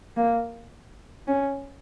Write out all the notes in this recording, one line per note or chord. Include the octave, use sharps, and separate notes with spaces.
A#3
C#4